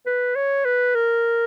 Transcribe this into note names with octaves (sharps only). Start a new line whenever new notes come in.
B4
C#5
B4
A#4